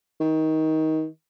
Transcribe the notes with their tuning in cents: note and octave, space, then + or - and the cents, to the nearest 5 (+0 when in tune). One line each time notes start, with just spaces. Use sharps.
D#3 +20